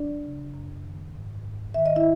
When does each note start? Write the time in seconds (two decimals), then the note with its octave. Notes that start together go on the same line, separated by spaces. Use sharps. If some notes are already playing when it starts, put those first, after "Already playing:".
Already playing: F#3 D4 D5
0.24 C#3
0.54 F#2
0.84 D#3
1.14 G#2
1.44 G#2
1.74 D#3 E5
1.86 D#5
1.96 E4 E5